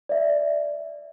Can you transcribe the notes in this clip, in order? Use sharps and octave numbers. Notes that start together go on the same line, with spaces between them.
D5 E5